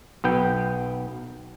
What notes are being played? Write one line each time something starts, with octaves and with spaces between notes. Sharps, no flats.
B1 B3 G5